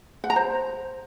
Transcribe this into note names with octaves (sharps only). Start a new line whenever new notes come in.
F#5
A#5
C5